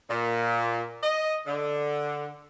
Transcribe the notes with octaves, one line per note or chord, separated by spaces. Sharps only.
A#2
D#5
D3